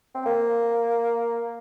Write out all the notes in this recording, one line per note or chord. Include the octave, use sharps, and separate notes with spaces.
C4
A#3